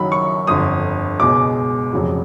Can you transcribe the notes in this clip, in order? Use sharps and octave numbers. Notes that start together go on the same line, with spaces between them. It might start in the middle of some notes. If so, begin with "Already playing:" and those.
Already playing: F#1 F#2 D#3 F#3 B5
C#6
G1 F2 D3 D#6
C#2 B2 G#3 D6
F1 F2 C#3 F#3